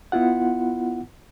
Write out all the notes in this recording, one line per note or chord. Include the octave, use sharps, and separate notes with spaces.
B3 E4 F4 F#5